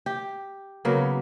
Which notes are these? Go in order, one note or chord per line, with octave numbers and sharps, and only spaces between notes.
G4
C#3 F#3 A#3 B3